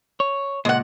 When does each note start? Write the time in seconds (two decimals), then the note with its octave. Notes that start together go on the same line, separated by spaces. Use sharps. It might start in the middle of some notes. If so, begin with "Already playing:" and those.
0.20 C#5
0.65 C#2 A#2 G#3 F#5